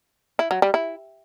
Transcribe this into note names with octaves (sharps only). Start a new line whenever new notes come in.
E4
F#3
G3
E4